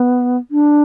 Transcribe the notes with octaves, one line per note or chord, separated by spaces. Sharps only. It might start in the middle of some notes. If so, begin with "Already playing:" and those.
Already playing: B3
D4